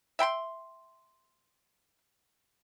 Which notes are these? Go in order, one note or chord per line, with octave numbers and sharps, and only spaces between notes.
E5 G5 B5 C6